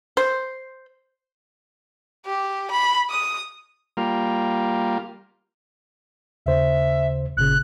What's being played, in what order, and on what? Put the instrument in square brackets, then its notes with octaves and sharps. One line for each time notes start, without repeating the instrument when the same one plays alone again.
[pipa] C5
[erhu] G4
B5
D#6
[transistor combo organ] G3 A#3 F4
[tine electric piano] D#2 C#3 C5 [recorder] E5
[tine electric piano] G1 A#2 C#3 [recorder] F#6